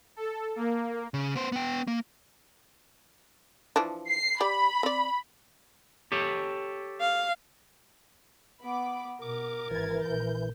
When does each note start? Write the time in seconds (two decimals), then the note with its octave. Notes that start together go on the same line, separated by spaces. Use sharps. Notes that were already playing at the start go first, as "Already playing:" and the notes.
0.16 A4
0.56 A#3
1.14 C#3
1.36 B3 C5
1.52 B3 G5
1.87 A#3
3.76 E3 F3 D4
4.09 C7
4.40 G4 D5 B5
4.83 C4 D5
6.12 G4 A4 C#5
7.00 F5
8.62 B3 B5 D6
9.22 B2 A#4 D6
9.71 G#1 E3 G#6 A6
10.03 A#1 G6